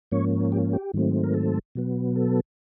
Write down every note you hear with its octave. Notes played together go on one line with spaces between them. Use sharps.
G#2 F3 A#3 C#4 C#5
G4
G4
G#2 D#3 F#3 A3 C4
A#4
A4
B2 F#3 B3
A4